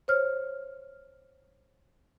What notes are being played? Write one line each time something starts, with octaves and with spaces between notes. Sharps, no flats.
C5 C#5 F6